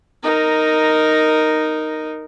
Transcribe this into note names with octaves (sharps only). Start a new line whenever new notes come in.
D#4 A#4